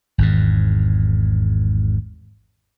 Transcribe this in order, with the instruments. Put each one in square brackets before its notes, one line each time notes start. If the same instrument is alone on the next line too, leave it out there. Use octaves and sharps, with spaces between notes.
[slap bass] G#1 E2 G#2